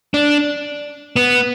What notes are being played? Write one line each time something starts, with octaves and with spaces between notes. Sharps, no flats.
D4
B3